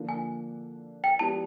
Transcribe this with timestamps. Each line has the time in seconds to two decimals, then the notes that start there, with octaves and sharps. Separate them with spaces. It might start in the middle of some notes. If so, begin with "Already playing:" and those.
Already playing: D3 F3 A#3
0.09 G#5
1.04 G5
1.19 F3 G#3 B3 D4 G4 A5